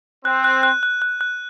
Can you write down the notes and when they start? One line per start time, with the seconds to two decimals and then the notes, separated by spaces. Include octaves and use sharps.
0.25 C4 F#6
0.44 F#6
0.63 F#6
0.83 F#6
1.02 F#6
1.21 F#6